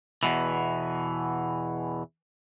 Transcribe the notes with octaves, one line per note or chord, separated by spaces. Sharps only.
E2 B2 E3